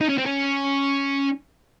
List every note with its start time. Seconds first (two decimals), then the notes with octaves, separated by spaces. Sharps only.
0.01 D#4
0.09 C#4
0.18 C4
0.26 C#4